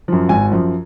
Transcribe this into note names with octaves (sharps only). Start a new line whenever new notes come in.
F#2 F3
G#1 G#5
F#2 F3